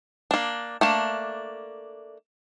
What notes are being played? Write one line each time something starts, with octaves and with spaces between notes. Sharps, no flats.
A#3 D4
A3 A#3 D4